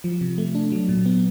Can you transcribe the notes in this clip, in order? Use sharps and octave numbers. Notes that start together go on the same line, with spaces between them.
F3
C3
A3
D4
F#3
A#2
B3